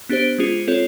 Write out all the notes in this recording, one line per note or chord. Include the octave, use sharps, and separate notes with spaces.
B3 D4 G4 C5
G#3 C#4 F4 G#4
C4 F4 A4 C#5